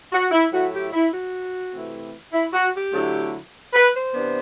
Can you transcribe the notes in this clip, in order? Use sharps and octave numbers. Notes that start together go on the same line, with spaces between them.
F#4
E4
A2 F#3 A3 E4 F#4
G4
E4
F#4
C3 E3 A3 C4 E4
E4
F#4
G4
D3 F#3 A3 E4
B4
C5
C3 E3 B3 D4